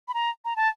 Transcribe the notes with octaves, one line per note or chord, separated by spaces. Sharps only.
B5
A#5
A#5
A5